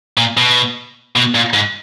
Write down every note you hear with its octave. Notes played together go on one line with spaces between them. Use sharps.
A#2
B2
B2
A#2
G#2